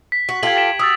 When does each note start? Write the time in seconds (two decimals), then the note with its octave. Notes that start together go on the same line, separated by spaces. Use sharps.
0.12 B6
0.29 F#4
0.43 F4 G4 A4 G#6 F#7
0.57 B6 D7 E7
0.79 F#4 D#6 E6 A6